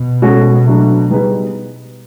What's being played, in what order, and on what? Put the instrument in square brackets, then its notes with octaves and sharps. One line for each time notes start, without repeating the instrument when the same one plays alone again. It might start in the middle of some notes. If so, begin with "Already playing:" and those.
Already playing: [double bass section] B2
[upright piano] G#3 C#4 F#4 A4
F#3 A3 D4 F#4
G3 B3 D#4 G#4 B4